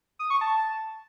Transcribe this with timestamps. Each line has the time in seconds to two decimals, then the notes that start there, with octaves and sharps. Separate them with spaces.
0.19 D#6
0.30 C#6
0.41 A5